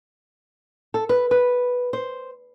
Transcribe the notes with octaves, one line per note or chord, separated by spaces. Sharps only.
A4
B4
B4
C5